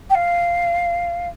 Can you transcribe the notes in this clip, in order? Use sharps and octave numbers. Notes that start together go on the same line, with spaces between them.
G5
F5